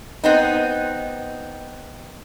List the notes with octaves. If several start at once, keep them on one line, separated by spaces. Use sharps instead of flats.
B3 C4 D#4